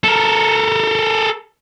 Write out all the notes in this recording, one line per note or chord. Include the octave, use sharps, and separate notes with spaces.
A4 A#4